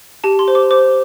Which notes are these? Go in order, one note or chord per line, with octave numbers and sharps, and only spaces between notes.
G4 A5
C6
C5
D6
C5 D6